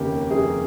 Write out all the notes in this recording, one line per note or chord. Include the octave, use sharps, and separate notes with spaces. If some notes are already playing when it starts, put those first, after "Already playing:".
Already playing: F1 D#2 C#3 A#3 G4 A#4
F1 G#4